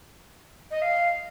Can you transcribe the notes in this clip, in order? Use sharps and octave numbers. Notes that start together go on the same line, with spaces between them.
D#5
F5